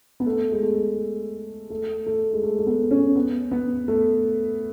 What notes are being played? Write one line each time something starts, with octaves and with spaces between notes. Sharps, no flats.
B3
A3
G#3
A3
A3
A3
G#3
A3
A3
B3
C#4
B3
B3
A3